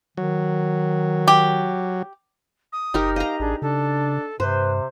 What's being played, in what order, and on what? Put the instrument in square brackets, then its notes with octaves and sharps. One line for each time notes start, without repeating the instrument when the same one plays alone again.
[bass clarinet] D#3 [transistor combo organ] F#3
[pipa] G4
[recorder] D#6
[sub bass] F#1 [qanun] D#4 G4 A#4
[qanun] D#5 A#5 [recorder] F5
[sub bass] A1 [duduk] D4 [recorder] G#4
[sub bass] C#3 [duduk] D4 [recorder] A4
[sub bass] G2 [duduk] C3 [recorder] B4 [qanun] C5